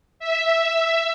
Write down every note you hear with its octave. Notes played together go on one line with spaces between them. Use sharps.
E5